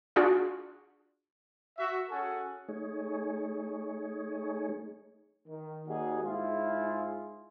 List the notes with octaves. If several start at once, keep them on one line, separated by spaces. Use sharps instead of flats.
D4 F4 F#4 G#4 D5
F#4 E5
C#4 F#4 G#4 A4 F#5 G#5
A3 D#4 G#4 C#5
D#3
D#2 G3 D#4 F#4 G#4
G#2 E4 F4 G#4